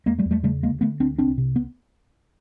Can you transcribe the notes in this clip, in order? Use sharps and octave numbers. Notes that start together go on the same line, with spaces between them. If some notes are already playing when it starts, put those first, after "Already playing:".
E2 G#3 A#3
G3 A3
E2
G3 A3
C#3 G3 A3
D2 G#3 A#3
D3 A3 B3
D2 C4 D4
C2 C4 D4
C3
B3